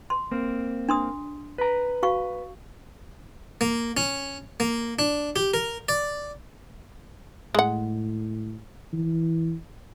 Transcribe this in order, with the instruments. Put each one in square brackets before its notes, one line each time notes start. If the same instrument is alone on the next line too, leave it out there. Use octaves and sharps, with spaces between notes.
[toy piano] C6
[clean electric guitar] A#3 C4
[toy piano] D4 C6 D#6
[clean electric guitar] B4 A#5
[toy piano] F#4 F5 C#6
[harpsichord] A#3
C#4
A#3
D4
G4
A#4
D5
[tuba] A2 [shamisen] G#3 F#5
[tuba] E3